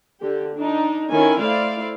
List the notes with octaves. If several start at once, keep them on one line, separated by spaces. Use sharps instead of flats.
D3 G4
D4 D#4
D#3 C#4 E4 A4 G#5
A3 E4 C5 D5 F5